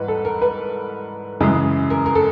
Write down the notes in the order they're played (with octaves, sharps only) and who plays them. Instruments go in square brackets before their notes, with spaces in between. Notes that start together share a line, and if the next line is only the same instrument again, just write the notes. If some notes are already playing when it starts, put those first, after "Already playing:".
Already playing: [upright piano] G#2 E3 G3 B4 F#5
A4
A#4
B4
F#2 C#3 E3 G#3
A#4
A#4
A4